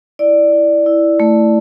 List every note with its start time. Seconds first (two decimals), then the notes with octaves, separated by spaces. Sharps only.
0.19 E4 D5
0.52 E4
0.86 E4
1.20 A3